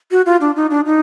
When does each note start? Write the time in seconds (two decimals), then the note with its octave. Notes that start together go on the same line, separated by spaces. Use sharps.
0.11 F#4
0.26 F4
0.41 D4
0.56 D#4
0.70 D4
0.86 D#4